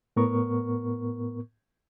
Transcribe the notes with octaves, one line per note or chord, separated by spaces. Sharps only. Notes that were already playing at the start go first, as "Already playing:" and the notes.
A2 B3 A#4 C#6